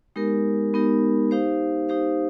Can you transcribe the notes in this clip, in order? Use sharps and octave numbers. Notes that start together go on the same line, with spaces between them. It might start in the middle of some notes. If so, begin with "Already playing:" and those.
G#3 B3 D#4 G4 A#4
G#3 B3 D#4 G4 A#4
D#4 G4 C5 F5
D#4 G4 C5 F5